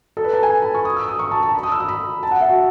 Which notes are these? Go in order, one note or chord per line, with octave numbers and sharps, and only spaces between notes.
A4
B4
A5
G#5
B5
C#6
D#6
E6
D#6
C#6
A5
A5
B5
D#6
E6
D#6
B5
A5
F#5
E5
F#4